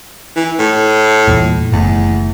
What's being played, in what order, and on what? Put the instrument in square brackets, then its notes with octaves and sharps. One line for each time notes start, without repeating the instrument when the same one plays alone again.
[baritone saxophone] E3
A2
[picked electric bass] E2 A#2
[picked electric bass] F#1 A2 [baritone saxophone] E2